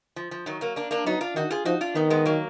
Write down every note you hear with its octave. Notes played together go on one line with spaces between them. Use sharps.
F3
F3
D#3 F#3
F#3 A#3
A#3 D4
A#3 D4
F#3 B3 D#4
D4 F4
D#3 D#4 F#4
F4 G#4
F3 D#4 F#4
D4 F4
D#3 B3 D#4
G#3 B3
F#3 A#3